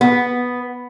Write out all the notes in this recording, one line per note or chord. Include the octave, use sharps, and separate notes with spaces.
B3